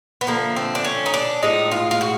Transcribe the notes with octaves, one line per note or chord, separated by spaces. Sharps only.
B3
D3 F3 A3 A#3
C4
D4
C#4
D#4
D4
A2 F3 G#3 D#4
F4
F4
F#4